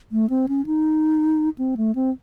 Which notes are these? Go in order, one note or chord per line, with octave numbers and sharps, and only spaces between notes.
A3
C4
C#4
D#4
C4
A3
C4